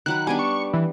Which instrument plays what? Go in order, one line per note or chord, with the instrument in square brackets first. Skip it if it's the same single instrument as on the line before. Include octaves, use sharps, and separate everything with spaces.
[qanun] D#3 F#3 B5 [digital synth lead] F#6
[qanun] G3 B3 D4 [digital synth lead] G#5
[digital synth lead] C#6
E3